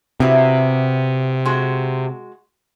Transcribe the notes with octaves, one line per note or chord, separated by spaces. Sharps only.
C3 B3 E4 F#4
G#3 F#4